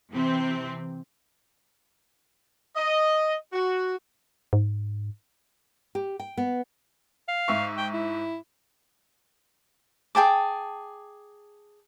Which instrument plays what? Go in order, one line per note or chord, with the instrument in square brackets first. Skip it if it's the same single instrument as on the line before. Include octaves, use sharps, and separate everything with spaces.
[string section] C3 E3 C4
[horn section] D#5
F#4
[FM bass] G#2
[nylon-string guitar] G4
G5
B3
[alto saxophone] F5
[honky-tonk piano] G#2 E5 C#6
[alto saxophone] G5
E4
[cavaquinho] G#4 G5 A5 D6